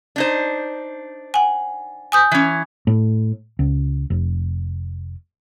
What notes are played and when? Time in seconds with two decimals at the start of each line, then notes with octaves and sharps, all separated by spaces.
0.16 D4 D#4 C5
1.34 F#5 G#5
2.12 G#5 D#6 G6
2.31 E3 C#4
2.87 A2
3.59 C#2
4.10 F1